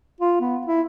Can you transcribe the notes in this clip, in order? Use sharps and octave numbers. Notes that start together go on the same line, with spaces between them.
F4
B3
E4